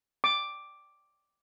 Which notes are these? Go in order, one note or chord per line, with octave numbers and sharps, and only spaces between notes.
D6